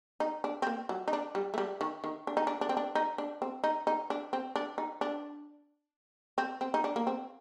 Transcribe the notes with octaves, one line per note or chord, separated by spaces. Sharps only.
D#4
D4
C4
A#3
F#3
D#4
D4
G3
A3
G3
D#3
D#3
D4
D#4
D4
D4
C4
D4
D#4
D4
C4
D#4
D#4
D4
C4
D4
D#4
D4
C4
C4
D#4
D4
A#3
C4